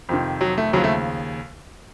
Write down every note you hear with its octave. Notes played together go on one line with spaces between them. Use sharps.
F2 C3 D#3
F#3
A3
D#2 C#3 F3 F#3
A3